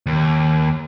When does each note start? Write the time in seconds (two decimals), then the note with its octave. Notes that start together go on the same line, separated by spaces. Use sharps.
0.06 D#2